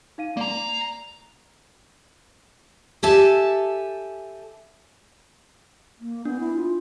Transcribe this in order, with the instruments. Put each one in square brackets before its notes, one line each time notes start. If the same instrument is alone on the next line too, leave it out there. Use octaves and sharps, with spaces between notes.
[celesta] D#4 F5 D#7
[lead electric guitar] A#3 A#5 [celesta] D5
[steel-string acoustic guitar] G4 A4 E5 G#5 A5
[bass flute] A#3
[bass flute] B3 [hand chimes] D4
[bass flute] E4
F4